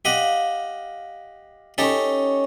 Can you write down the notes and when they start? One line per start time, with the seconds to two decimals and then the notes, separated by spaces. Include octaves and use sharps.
0.05 G4 D#5 F5 F#5
1.78 C#4 D#4 G4 A4 C#6